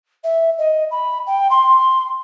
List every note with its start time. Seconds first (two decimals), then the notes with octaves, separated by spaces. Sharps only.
0.24 E5
0.58 D#5
0.90 B5
1.26 G5
1.50 C6